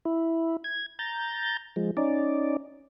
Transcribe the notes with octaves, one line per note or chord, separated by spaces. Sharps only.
E4
G#6
A#5 G6 A6
F3 G#3
C#4 D#4 D5